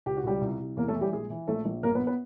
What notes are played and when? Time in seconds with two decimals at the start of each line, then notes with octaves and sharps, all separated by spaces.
0.06 C#2 G4
0.17 F#4
0.24 C#2 G3 G4
0.41 C2
0.59 C2
0.76 E2 A#3 A#4
0.88 A3 A4
0.94 E3
1.01 G3 G4
1.12 A#1 G#3 G#4
1.30 E3
1.48 A#1 A3 A4
1.65 A#1
1.83 G1 A#3 A#4
1.95 B3 B4
2.07 B3 B4